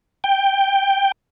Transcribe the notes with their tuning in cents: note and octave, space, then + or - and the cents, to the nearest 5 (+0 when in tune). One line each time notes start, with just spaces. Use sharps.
G5 +5